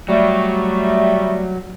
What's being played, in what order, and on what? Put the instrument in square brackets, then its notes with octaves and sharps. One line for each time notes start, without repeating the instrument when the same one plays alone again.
[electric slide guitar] F#3 [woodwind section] G3 A3